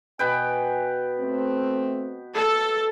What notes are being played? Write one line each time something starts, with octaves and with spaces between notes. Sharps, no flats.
B2 B4 G5 G#5
A3 C4
A4